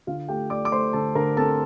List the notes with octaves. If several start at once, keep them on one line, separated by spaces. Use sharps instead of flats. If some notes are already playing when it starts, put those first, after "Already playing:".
D3 F4 F5
A3 G4 G5
A3 D5 D6
D6
A3 C5 C6
D3 A4 A5
D3 A#4 A#5
C4 A4 A5